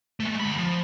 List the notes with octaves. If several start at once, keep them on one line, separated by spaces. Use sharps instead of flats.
G#3 A3
D2 B5
F3